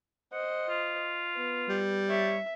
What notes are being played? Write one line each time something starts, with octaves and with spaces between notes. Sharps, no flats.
C5 D#5 F#5
F4
B3
G3
C#5 E5